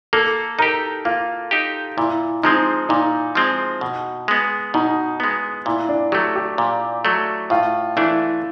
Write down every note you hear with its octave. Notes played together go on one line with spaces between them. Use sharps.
A#3 A4
D#4 G4 A#4
A#3 F4
D#4 G4
A#2 E4
F3 G#3 C4 D#4
A#2 D#4
F3 G#3 C4
B2
G#3 B3
B2 D#4
G#3 B3
A#2 E4
D4
F#3 A3 G4
G4
A#2
F#3 A3
A2 F4
E3 A3 D4 E4